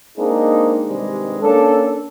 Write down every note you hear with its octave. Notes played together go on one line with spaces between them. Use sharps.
G#3 A#3 C4 D4 D#4 G#4
G2 C3 D#3 G3 G#3
A#3 C#4 D4 A4